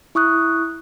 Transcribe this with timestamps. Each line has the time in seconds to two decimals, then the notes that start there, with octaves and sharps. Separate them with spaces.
0.15 E4 C#6 D#6 F#6